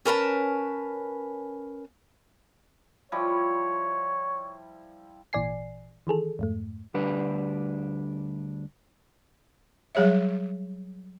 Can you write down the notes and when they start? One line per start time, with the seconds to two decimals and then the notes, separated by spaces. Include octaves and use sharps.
0.06 C#4 A#4 B4 A5
3.12 F3 G3 E4 C#5
5.33 G#1 A#2 E3 D5 G#5 C7
6.07 D#3 E3 G#4 A4
6.39 F2 G#2 A3
6.94 D2 G3 D4 B4
9.95 F#3 G3 G#4 C#5 E5